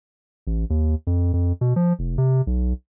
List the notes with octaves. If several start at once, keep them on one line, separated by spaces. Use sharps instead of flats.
A1
D#2
F2
F2
B2
F3
F1
C3
B1